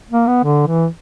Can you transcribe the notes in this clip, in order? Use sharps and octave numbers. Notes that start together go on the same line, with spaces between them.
A#3
B3
D3
E3